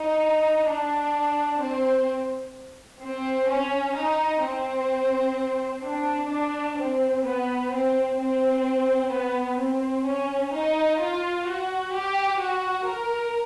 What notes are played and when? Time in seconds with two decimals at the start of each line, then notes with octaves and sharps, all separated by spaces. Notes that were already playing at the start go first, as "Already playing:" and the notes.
Already playing: D#4
0.68 D4
1.61 C4
3.02 C4
3.49 C#4
3.96 D#4
4.43 C4
5.84 D4
6.30 D4
6.78 C4
7.24 B3
7.71 C4
8.17 C4
9.11 B3
9.58 C4
10.04 C#4
10.52 D#4
10.98 F4
11.46 F#4
11.93 G4
12.39 F#4
12.86 A#4